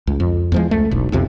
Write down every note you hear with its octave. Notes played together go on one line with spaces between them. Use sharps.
C#2
F2
E2 F3 G#3
C#2 A3
E1 B1
B1 F2 C3 F3